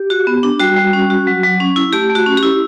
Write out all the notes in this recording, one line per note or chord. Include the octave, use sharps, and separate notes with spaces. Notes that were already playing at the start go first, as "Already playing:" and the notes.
Already playing: G4
F#4
B3
D4
G3 F#4
G3
C#4
F#4
F#3
F#3
C#4
E4
A3 G4
A3
F#4
C#4
G4
E4